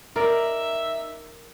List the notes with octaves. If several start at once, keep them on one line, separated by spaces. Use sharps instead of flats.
D#4 A#4 D5 E5